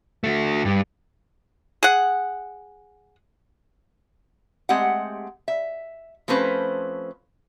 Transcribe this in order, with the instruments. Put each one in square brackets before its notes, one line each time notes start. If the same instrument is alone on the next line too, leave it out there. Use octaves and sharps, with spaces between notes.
[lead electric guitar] D3 A3
G2
[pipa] G#4 F#5
[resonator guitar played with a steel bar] G#3 A3 C4 G4 F#5
E5
F3 A3 C4 C#4 B4 C5